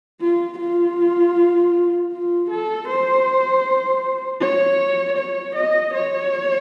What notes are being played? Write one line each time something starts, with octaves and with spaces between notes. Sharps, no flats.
F4
F4
F4
A4
C5
C#5
C#5
D#5
C#5